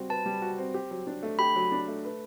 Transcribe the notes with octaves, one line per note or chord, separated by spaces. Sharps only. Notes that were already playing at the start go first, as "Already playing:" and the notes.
Already playing: G3 C4 F#4
B4 A5
G3
F#4
C4
G4
F#3
D4
A3
G4 B5
F#3
D4
A3
B4